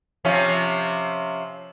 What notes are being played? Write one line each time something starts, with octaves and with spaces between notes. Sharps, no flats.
C3 F3 C#4